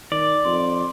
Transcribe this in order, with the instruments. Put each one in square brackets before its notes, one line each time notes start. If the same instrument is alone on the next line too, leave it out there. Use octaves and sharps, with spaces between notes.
[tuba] D#3 [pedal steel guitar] D5
[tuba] F2 [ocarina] C6